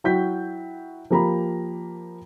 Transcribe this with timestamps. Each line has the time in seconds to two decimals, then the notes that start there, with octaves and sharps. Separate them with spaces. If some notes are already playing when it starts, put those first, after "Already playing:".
0.04 F#3 E4 F#4 G5 G6 B6
1.10 F3 A#3 G4 A#5 B5